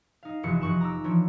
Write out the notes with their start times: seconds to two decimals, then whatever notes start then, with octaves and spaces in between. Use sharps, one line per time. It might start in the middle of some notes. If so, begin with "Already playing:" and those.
0.23 D#4 F5
0.43 F1 E3 E4 F#4 C#7
0.61 F1 D#4 C#6 F#6 E7
0.81 A#5 D6 E6
1.04 E3 F3 D4 C#5